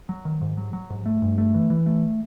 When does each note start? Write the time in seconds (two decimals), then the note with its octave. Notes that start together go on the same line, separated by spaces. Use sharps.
0.09 F#3
0.25 D#3
0.41 G#2
0.57 F#3
0.73 F#3
0.90 G#2
1.06 A3
1.22 G2
1.38 A3
1.54 E3
1.70 E3
1.86 A3